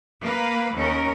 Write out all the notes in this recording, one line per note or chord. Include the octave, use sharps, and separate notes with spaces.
A#3 B4 F5
D#2 C#4 A#4